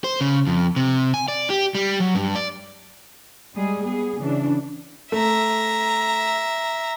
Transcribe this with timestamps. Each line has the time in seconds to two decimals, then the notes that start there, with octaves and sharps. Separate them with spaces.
0.04 C5
0.21 C#3
0.47 F2
0.76 C3
1.14 G#5
1.28 D5
1.50 G4
1.75 G3
2.00 F#3
2.15 G2
2.36 D5
3.54 G3 G#3 G#4
3.84 B3 G#4
4.21 C#3 E3 D4
5.12 A3 E5 A#5